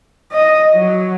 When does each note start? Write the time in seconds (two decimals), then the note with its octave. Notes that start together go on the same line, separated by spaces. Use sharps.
0.32 D#5
0.73 F#3